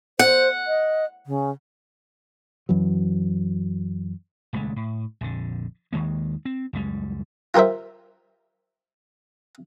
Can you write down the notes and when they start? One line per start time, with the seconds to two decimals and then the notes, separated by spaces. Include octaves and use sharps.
0.19 C5 F#5
0.67 D#5
1.26 C#3
2.69 F#2 E3 F#3
4.53 D#1 C#2 G#3 A3
4.76 A2
5.21 A#1 F2 D3
5.93 D#2 D#3 G#3 A#3
6.45 C4
6.73 C#2 F#2 G3 G#3
7.54 F4 G4 A#4 C5 E5